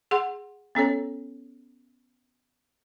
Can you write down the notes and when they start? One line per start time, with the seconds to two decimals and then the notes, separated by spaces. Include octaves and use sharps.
0.11 G#4 F#5 C6
0.75 B3 C#4 A4 C#5